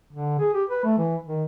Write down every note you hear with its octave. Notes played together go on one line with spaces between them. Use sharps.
D3
G#4
G4
B4
A3
E3
D#3